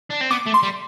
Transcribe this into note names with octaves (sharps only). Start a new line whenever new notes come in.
D4
C4
B3 D6
A3
C6
G3